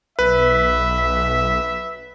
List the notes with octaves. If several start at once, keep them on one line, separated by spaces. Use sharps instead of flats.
B1 B4 E5